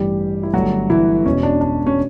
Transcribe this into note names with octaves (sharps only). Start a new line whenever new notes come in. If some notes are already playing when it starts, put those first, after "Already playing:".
Already playing: A1 G2 E3 G3 G4
E4
G1 G2 F#3 A3 F#4
E3 E4
E1 E2 B2 C#4
D4
D4
C#4